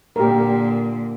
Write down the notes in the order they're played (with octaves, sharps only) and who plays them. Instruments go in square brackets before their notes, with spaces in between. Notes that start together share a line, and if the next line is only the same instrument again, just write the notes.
[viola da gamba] A#2 D3 [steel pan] G4 A#4